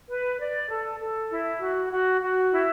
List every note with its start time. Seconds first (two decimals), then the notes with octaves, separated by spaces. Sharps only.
0.08 B4
0.39 D5
0.69 A4
0.99 A4
1.30 E4
1.60 F#4
1.90 F#4
2.21 F#4
2.51 E4